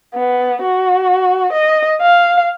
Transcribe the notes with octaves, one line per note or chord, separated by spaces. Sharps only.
B3
F#4
D#5
F5